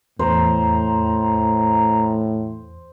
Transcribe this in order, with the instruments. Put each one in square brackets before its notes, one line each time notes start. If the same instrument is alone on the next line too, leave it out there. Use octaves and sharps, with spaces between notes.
[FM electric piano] E2 [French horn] A2 [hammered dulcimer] C5 [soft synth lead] A#5